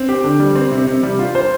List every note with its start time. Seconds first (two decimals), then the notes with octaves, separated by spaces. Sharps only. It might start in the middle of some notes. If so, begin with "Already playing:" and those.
Already playing: C4
0.09 G4
0.24 D3
0.40 G3
0.56 C4
0.72 C3
0.87 C3
1.03 G3
1.19 F4
1.35 C5